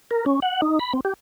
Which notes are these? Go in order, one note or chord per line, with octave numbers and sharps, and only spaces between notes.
A#4
C#4
F#5
D#4
B5
C4
G4